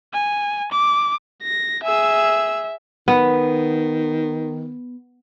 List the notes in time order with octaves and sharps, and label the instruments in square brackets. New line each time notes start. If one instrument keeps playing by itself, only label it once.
[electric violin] G#5
D6
A#6
[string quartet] G#4 E6 [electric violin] E5
[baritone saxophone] D#3 [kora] B3